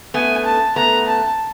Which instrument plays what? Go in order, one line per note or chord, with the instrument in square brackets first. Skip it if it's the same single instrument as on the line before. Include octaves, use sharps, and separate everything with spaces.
[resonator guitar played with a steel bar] A3 B3 [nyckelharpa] G#5
[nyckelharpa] A5
[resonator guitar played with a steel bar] A3 B3 [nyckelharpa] A#5
[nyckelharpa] A5